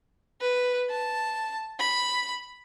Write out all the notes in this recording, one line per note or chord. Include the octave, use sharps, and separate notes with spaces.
B4
A5
B5